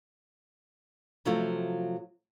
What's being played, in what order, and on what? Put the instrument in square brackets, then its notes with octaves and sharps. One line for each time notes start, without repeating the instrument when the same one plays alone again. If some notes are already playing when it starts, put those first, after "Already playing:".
[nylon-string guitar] C3 F3 F#3 A3 E4 F4